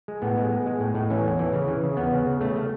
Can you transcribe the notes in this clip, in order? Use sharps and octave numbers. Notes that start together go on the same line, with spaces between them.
G#3
A2 B3
G#3
G#3
G#3
A2
A2
E3 C#4
E2
E3
C#3
E3
C#3
E2 B3
C#3
C#3
C#3 A3
A3